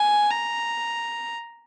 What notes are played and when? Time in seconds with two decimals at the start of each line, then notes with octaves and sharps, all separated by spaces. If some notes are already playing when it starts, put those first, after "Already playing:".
Already playing: G#5
0.30 A#5